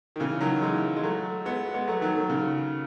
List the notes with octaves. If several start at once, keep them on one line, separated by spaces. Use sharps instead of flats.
D#3
C#3 E3
D#3 F#3
E3 G#3
G#3
F#3 A3
G#3 B3
G#3 B3
F#3 A3
D#3 F#3
D#3
C#3